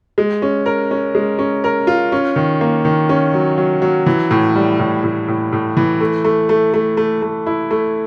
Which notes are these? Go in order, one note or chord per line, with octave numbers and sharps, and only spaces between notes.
G#3
C#4
A#4
C#4
G#3
C#4
A#4
F4
C#4
D#3
A#3
D#3
C#4
F#3
F#3
F#3
E3
A2
G3
A2
A2
A2
A2
E3
A3
A3
A3
A3
A3
A3
E4
A3